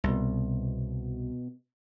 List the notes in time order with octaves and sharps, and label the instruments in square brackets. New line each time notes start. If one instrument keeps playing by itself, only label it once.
[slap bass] C2 [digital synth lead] B2